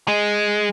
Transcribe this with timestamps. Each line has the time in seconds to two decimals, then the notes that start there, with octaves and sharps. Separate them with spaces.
0.08 G#3